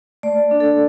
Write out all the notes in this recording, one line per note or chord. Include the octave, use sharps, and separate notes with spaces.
A3 D5
D4
A4